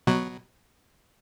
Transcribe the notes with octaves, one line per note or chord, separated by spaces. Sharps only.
B2 F#3